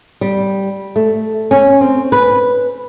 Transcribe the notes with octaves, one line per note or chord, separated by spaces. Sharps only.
G3
A3
C#4
C4
B4